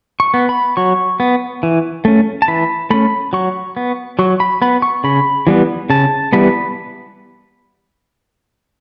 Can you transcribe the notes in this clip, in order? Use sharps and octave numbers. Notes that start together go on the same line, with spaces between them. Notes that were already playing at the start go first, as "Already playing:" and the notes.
C#6
B3
B5
F#3 C#6
B3
E3
A3 C#4
A5
E3 B5
A3 C#4 B5
F#3 C#6
B3
F#3 C#6
B5
B3 B5
C#6
C#3 B5
E3 G3 B3
C#3 A5
E3 G3 B3 B5